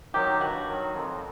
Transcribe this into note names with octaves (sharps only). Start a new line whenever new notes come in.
D#3 F#3 G4
G2 F#4
D#3 F#3
F2